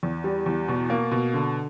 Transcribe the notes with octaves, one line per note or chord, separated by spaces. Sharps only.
E2
G3
E2
B2
A#3
B2
D3